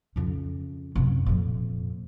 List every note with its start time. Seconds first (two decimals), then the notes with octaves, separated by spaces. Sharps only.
0.16 F2 C#3
0.95 F#2 C3
1.26 F2 A#2